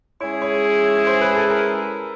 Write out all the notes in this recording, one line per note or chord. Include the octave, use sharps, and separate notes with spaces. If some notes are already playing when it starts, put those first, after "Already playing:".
G#3 C#4 E4 G#4 C#5
C#5
C5
B4
A4
A#4